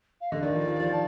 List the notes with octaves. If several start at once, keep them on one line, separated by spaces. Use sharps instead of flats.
F5
D3 D#5
D#3 D5
F3
F3
F3
A5